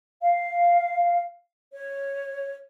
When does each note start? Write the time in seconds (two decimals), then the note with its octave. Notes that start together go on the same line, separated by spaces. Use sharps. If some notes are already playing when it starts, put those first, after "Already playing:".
0.21 F5
1.74 C#5